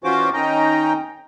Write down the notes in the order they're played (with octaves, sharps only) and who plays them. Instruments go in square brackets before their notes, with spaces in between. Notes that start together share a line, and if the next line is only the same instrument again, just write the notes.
[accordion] E3 C#4 F4 F#4 C5 D6
D#3 C#4 D#4 D#5 G5 A#5